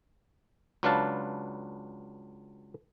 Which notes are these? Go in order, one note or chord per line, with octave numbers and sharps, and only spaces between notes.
C#2 F#3 D4 B4 F5 A5